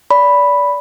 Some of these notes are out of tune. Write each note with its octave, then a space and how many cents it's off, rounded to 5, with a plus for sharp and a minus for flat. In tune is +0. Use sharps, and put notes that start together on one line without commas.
D5 -25 B5 +0